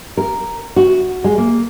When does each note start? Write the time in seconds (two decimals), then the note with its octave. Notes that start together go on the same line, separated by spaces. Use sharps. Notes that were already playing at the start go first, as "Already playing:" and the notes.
0.17 A#4
0.76 F#4
1.24 G#3
1.38 A#3